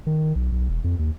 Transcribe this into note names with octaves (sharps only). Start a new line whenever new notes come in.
D#3
B1
B1
E1
F2
D#2